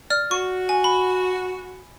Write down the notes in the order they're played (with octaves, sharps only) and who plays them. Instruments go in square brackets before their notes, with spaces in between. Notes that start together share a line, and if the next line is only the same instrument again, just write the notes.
[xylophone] D5 F6
[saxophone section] F#4 [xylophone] C#6
[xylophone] G#5
B5